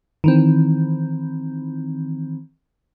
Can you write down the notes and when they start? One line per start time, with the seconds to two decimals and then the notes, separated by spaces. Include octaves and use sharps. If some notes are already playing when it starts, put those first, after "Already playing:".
0.24 D#3 E3 C4